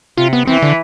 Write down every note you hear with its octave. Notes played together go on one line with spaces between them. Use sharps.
C3 F4
B3
E3 C4
D3